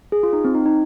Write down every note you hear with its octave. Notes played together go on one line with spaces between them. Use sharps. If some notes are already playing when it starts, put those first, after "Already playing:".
G#4
F4
D#4
C4
D#4
D#4